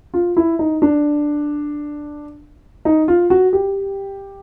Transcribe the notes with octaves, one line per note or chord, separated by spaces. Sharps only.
F4
E4
D#4
D4
D#4
F4
F#4
G4